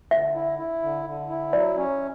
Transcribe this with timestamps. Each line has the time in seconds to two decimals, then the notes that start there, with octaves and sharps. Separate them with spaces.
0.11 D3 E5
0.35 E4
0.59 E4
0.83 D3
1.06 D3
1.29 E4
1.53 F#3 D5
1.77 C#4